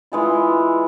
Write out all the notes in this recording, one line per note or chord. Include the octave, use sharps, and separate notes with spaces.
E3 G#3 F4